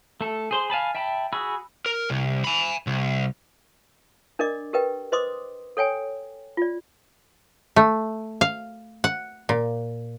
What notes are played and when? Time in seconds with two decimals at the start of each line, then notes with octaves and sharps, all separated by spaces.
0.21 A3 A4
0.51 G#4 C5 C6
0.70 F5 G#5 A5 B5
0.95 E5 G5 A5 B5
1.33 F#4 G#4 B5 E6
1.86 A#4
2.10 C2
2.44 G#5 B5
2.87 C2
4.39 D4 A#4 D5 D#5 D6
4.73 G4 A#4 B4 D#5 G5
5.12 B4 C5 D#5 C6 D6 D#6
5.77 A4 C#5 G5 G#5
6.57 F4 D5
7.76 A3
8.41 F5
9.04 F#5
9.49 A#2